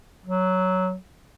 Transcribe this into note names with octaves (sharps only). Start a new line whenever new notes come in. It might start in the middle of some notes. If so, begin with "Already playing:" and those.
F#3